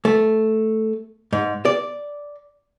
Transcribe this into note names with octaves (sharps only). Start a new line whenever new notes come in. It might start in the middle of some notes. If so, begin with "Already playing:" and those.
A3
G#2
D5